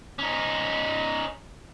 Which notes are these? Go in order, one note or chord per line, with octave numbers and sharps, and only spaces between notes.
C#4 D#4